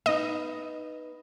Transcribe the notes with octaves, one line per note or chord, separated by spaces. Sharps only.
B3 D#4 D#5